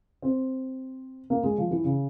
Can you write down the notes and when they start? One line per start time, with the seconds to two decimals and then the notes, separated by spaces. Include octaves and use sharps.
0.22 C4
1.30 A#3
1.43 G#3
1.58 F3
1.71 E3
1.84 C#3